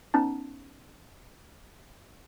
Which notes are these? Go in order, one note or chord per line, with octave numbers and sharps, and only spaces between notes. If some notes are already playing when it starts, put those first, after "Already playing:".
B3 C#4 D#4 A5